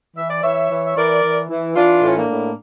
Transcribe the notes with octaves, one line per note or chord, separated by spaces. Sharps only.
E3 E5
D5
E3 C#5 E5
E3
E5
E3 A#4 D5
E3
E3
E3 D4 F4
A2 C#4
A#3 D4
A2